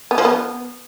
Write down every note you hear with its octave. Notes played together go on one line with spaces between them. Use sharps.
B3
F3
B3